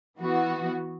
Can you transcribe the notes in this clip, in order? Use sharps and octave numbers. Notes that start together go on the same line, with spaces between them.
E3 B3 F#4